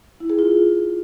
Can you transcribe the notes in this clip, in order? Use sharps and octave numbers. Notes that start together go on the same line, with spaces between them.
E4
G#4
F4